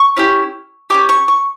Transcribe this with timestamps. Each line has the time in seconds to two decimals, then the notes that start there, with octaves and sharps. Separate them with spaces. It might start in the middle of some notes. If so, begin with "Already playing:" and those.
Already playing: C#6
0.17 C#4 E4 G4
0.90 C#4 E4 G4 D6
1.09 C#6
1.28 C#6